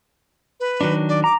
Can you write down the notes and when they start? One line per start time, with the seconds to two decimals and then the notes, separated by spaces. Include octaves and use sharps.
0.60 B4
0.81 D#3 F#3 D4
1.09 D5
1.24 A#5 D6